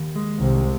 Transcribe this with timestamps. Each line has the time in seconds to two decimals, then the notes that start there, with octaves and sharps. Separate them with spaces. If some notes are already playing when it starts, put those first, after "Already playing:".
Already playing: D#2
0.16 G#3
0.40 C2 C3 D#3